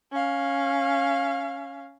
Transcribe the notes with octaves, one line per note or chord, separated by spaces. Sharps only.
C#4 F5